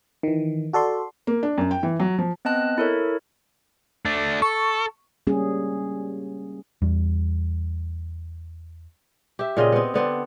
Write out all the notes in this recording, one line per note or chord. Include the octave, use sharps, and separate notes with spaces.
D#3 E3
F#4 A4 D5 C6
A#3
D4
F#2
G5
E3
F#3
F3
B3 C4 D#5 A5 F#6
E4 A4 A#4 C#5
A3 D4
A4 C#6
G3 A#3 C#4 G#4
E2 G3
G4 E5
A#2 C#3 C4 D#5
B3 C4
D3 B3 C4 D4